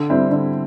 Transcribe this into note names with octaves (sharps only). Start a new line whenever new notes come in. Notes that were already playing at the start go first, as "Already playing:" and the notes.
Already playing: D3
G3 C4 E4
D3